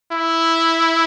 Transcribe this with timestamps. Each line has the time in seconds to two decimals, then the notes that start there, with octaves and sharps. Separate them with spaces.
0.12 E4